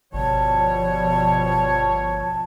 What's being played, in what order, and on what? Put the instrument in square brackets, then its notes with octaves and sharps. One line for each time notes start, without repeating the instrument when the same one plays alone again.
[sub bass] G1 [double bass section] B2 F3 [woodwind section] G3 C#5 [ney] A5